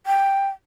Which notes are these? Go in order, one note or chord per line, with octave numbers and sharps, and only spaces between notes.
G5